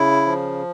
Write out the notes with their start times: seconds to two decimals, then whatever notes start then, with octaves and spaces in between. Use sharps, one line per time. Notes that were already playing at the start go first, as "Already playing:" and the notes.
Already playing: C#3 E4
0.26 F3